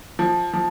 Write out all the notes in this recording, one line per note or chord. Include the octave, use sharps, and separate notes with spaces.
F3
F3